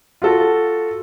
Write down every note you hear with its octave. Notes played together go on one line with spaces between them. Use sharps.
F4 F#4 A4